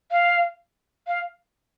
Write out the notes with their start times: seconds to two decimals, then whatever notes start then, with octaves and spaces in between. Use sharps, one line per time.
0.11 F5
1.07 F5